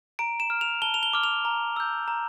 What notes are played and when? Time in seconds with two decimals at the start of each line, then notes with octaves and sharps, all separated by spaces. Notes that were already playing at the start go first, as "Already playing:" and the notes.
0.19 A#5 D7
0.40 E7
0.50 F6
0.61 F7
0.82 A5 G7
0.94 F7
1.03 G7
1.13 D6 F6
1.23 F7
1.45 A#5
1.76 E6 G6
2.08 A#5